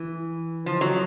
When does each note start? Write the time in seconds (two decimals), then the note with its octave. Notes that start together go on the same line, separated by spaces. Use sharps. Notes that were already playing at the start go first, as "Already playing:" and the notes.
Already playing: E3
0.66 F3
0.81 F#3